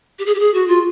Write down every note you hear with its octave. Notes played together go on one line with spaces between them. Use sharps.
G4
G#4
G4
G#4
F#4
F4